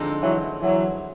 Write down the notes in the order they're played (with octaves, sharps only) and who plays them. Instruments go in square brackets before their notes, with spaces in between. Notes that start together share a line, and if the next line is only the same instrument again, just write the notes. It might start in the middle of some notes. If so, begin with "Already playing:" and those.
Already playing: [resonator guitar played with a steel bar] D3 F3 G#3 C4 D#4
[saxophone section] E3 F#3
E3 F#3